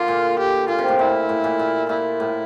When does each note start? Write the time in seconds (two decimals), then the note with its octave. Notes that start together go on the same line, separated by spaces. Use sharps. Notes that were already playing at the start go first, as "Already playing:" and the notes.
Already playing: D3 A#3 F4
0.08 A#2
0.39 G4
0.68 A#2 F4
0.79 C3
0.88 A2
0.99 A#2 E4
1.29 A2
1.44 A#2
1.59 A#2
1.89 A#2 E4
2.20 A2